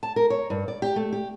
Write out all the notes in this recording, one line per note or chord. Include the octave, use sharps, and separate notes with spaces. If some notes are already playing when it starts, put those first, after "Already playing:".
A5
A#4
C#5
G2
D5
G4
A3
G4